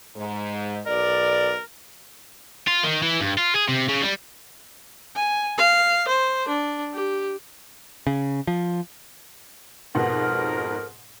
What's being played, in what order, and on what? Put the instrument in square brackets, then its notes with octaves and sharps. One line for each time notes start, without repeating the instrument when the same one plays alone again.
[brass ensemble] G#2
[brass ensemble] B1 D5 [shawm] A#4
[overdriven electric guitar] F4
D#3
E3
G2
F4
G#4
C3
C#3
G3
[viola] G#5
F5
C5
D4
G4
[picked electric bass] C#3
F3
[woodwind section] F2 A#4 [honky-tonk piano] G#2 B2 F#5